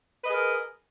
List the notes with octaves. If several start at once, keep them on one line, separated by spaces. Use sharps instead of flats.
G#4 A#4 B4 D#5